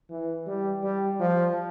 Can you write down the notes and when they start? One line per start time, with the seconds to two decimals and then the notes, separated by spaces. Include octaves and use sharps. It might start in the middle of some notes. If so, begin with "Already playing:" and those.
0.10 E3
0.47 G3
0.84 G3
1.20 F3